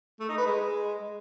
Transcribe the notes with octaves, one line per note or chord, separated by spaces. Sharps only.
A3
D#4
B4
G#3